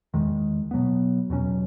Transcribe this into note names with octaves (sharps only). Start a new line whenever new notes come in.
E2 D#3 G#3
B2 F#3 B3
E2 B2 F#3 C#4